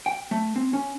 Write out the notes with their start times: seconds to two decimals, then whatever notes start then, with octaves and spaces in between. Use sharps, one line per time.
0.06 G5
0.31 A3
0.56 C4
0.73 C#4